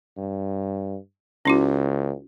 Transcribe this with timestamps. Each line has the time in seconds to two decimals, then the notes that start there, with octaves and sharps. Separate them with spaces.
0.17 G2
1.45 C#2 C#4 E4 F#4